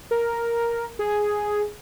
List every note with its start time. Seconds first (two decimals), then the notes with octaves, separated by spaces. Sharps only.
0.11 A#4
0.99 G#4